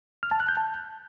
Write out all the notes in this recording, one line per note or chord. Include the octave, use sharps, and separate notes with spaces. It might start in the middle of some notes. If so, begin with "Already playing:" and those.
F6
A5
F#6
G6
A5